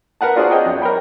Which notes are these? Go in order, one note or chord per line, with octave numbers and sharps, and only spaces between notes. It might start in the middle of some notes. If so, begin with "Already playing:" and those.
A#4 B4 F#5 A5
D4 F4 F#4 G#4 C5 D5
G#4 C#5 D#5 G5 G#5
F#2
A#4 C#5 G5 B5